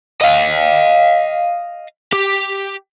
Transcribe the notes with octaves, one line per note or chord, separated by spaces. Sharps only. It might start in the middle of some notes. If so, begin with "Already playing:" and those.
D#5 F5
G4